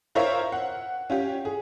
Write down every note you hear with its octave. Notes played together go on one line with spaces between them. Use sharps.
F4 A#4 C5 C#5 E5 F5
F#5
C#4 F4 G4
G#4